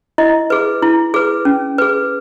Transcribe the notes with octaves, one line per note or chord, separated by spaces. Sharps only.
E4 D#5
G#4 B4
E4
G#4 B4
C#4
G#4 B4